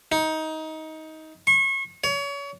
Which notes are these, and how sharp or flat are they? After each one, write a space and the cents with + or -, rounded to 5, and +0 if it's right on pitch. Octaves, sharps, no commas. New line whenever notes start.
D#4 +20
C#6 -35
C#5 +30